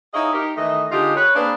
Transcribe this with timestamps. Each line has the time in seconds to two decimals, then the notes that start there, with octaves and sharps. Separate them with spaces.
0.14 D#4 E4 G#4 C#5 D#5 F5
0.33 D#4 G4 A#4
0.57 D#3 E3 A3 D#5
0.92 D3 G#3 D#4 F4 G4
1.16 B4 C#5
1.36 A#3 C4 D4 G#4 B4